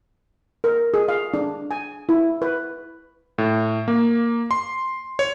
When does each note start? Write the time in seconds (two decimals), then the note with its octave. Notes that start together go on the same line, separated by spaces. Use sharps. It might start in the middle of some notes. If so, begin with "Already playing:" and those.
0.64 A#4
0.94 G#4
1.08 F5
1.34 D4
1.71 G#5
2.09 E4
2.42 B4
3.38 A2
3.88 A#3
4.51 C6
5.19 C#5